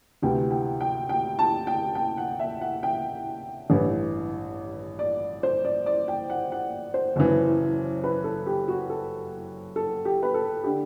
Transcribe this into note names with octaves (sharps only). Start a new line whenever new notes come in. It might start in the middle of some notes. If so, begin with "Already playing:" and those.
D2 C3 E3 G5
G5
G5
G5
A5
G5
G5
F#5
E5
F#5
G5
A1 G2 E3
D5
C5
D5
D5
G5
F#5
F#5
C5
F#1 F#2 E3
B4
A4
G4
F#4
A4
A4
G4
B4
A4
D3 G4